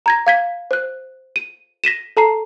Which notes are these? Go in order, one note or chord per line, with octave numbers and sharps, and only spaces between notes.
A#5 G#6 A#6
F5 G#6 B6
C5 F#6
D#7
A#6 B6 D#7 E7
A4 A5 A#5 C7